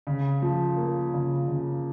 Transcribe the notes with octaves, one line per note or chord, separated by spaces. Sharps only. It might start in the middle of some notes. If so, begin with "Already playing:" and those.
C#3
F3
A#3
C#3
C#3